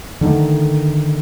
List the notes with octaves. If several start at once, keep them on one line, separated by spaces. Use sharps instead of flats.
D3 D#3 G3 A3